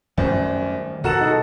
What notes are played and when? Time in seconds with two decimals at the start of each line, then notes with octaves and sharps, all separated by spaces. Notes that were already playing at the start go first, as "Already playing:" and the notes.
0.18 F#2 D#3 G3 A3 G4 C5 D5
1.04 B2 F#4 A4 A#4 F#5 E7
1.20 D#4 G#4 A5